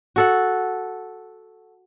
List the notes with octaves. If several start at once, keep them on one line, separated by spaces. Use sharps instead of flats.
F#4 A4 F#5